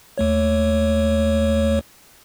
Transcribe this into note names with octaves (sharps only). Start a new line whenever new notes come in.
D#2 A3 C#5